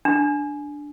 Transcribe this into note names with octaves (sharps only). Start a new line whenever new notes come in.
D4